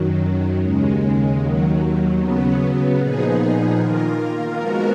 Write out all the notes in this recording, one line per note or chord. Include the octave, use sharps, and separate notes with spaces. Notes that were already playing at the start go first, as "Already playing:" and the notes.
Already playing: F#2 D#3 F#3
D#2 C#3 G#3
D#2 D#3 F#3
C#3 F#3 B3
A#2 F3 B3 D#4 G#4
D#3 A#3 F4 A#4
F3 G#3 B3 F#4 A#4